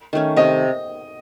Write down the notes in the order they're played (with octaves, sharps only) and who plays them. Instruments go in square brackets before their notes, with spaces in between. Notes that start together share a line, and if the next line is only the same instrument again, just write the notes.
[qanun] D#3 A3 C#4
[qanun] C3 [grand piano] D#5